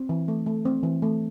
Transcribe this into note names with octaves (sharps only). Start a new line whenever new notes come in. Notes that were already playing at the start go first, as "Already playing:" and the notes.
Already playing: C4
E3
A3
A3
C4
E3
A3